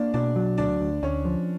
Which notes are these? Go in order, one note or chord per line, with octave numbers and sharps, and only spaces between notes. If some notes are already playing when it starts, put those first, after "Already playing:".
Already playing: A#3 D4 D5
B2 D4 D5
F#3
D2 D4 D5
D2
D2 C#4 C#5
F3